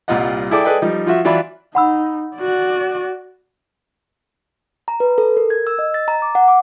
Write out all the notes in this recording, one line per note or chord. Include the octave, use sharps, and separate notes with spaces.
C2 A#2 G3 F4 D#5 F#5
E4 G#4 A4 D5 G5 D6
G#4 A4 B4 D5 D#5 G5
F3 G3 D#4
F3 F4 F#4 E5
E3 F#3 F4 D5 E5 B5
D#4 F#5 B5 E6
F#4 D5
A#5
B4
A4
A#4
G#6
E6
D#5
A6
A#5
D6
F#5
D6